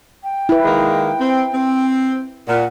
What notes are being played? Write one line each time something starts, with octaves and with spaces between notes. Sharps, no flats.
G5
E4 B4
D#3 G#3 A#3
C4
C4
A#2 F#5